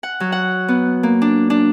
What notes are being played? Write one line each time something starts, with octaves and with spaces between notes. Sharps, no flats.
F#5
F#3
F#5
B3
A#3
D4
D4